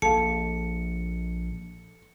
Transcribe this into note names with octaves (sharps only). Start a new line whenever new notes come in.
A#1 A4 F5 A5 C#7